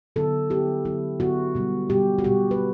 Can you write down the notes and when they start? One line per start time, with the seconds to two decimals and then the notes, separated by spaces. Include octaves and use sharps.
0.16 D3 F#3 B3 E4 A4
0.50 D3 F#3 B3 E4 G4
0.85 D3 F#3 B3 E4
1.20 D3 F#3 B3 E4 F#4
1.55 B2 G3 B3
1.90 B2 G3 B3 G4
2.19 F#4
2.24 B2 G3 B3 G4
2.51 B4